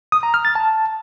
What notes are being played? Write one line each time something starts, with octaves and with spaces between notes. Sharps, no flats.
D#6
A#5
F6
A6
A5